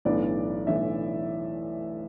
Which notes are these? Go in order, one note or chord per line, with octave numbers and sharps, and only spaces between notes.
B1 A2 E3 B3 D4 D5
B1 A2 E3 B3 D4 E5